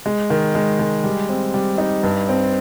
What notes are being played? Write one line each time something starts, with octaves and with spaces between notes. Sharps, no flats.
G#3
D#3
G#3
G#3
G3
C4
G3
D#4
G2
C4